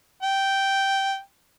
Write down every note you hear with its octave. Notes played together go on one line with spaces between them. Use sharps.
G5